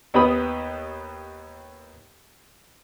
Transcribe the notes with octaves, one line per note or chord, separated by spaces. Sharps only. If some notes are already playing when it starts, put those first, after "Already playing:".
D#2 B3 G4 B4 B5 D#6